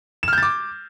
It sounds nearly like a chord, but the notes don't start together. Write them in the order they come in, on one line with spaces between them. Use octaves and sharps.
E7 F6 G6 A6 D6